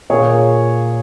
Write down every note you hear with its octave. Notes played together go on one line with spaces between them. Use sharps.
A#2 A#3 G#4 C#5